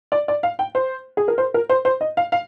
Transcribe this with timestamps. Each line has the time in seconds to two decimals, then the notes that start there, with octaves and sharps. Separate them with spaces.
0.12 D5
0.28 D5
0.43 F5
0.59 G5
0.75 C5
1.17 G#4
1.28 A#4
1.38 C5
1.54 A#4
1.69 C5
1.85 C5
2.01 D#5
2.17 F5
2.32 F5